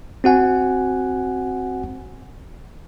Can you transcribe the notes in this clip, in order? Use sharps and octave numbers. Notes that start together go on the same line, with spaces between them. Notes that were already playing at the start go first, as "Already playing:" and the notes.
C4 F#4 F#5 G#5